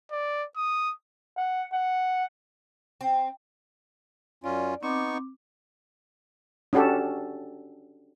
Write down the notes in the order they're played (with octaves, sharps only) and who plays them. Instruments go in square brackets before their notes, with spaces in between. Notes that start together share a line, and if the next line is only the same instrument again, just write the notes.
[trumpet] D5
D#6
[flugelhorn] F#5
F#5
[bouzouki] C4
[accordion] F#2 C#4 F4 [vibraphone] D5
[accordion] B3 D#4 C#6 [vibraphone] C4 D6
[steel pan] C#4 D4 F#4 G4 A4